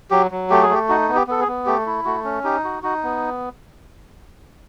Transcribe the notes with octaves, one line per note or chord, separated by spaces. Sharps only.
F#3 G4
F#3
A3 G4
G#4
A3 G4
D#4 F#4
B3
G4
B3 A4
G#4
B3
A3 G4
E4
A3 F#4
C#4
D#4 G4
F#4
D#4 F#4
B3